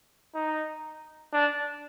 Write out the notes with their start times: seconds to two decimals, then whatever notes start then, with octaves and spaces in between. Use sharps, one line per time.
0.34 D#4
1.33 D4